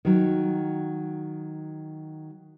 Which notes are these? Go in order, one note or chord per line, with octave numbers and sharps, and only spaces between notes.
D#3 F#3